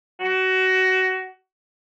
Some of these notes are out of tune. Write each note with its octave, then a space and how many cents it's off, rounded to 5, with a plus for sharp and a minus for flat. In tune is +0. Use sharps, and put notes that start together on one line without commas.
F#4 +20